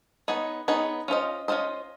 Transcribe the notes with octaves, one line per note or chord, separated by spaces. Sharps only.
B3 D#4 G#4 C#5
B3 D#4 G#4 C#5
C#4 F4 A4 C5 D#5
C#4 F4 A4 C5 D#5